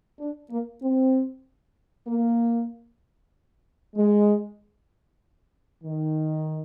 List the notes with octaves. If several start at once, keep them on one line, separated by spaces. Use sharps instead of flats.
D4
A#3
C4
A#3
G#3
D#3